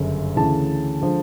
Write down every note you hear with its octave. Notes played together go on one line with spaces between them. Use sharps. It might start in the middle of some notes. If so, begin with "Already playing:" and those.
Already playing: G1 F#2 C#3
D2 C#3 E3 A5
D3 F3 G#3